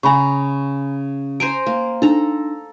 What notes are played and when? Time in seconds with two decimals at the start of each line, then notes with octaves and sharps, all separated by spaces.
0.03 C#3 G#5 A#5 B5 C#6
1.40 C5 G#5 A#5 D7
1.66 A#3
2.02 D4 D#4 A4 A#5